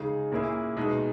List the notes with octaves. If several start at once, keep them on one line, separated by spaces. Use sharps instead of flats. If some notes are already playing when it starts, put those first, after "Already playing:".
Already playing: C#3 G#3 D#4 G#4
A#2 A#3 C#4 E4 G#4
B2 G#3 D#4